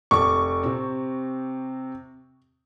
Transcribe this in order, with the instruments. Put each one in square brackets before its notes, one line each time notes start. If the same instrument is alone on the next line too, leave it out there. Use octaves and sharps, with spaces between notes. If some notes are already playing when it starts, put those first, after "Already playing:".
[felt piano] F1 A5 D6 [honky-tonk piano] C#6
[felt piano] C3 C4